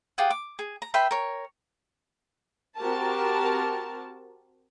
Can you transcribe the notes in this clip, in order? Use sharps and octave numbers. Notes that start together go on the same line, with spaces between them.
F4 G4 G#4 F#5
D6
G#4
A#5
B4 E5 G5 C6
A#4 C#5
C4 F#4 G4 A#4 A5